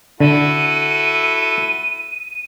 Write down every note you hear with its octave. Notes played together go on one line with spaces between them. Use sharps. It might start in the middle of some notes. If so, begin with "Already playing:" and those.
D3 E4 F#4 A4 D#7